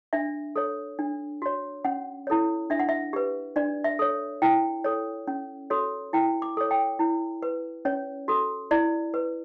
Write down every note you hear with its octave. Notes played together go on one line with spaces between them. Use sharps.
D4 E5
A4 C#5
D4
F#4 C#5
C#4 F#5
E4 A4 C#5
D4 E5
F#5
E5
G4 B4
D4 D5
E5
A4 C#5
E4 G5
A4 C#5
C#4
F#4 A4 C#5
E4 G5
D6
A4 C#5
G5
E4
B4
C#4 C#5
F#4 A4
E4 D5
B4